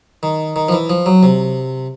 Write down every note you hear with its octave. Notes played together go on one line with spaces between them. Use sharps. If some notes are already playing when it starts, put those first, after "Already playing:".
D#3
D#3
F3
E3
F3
F#3
C3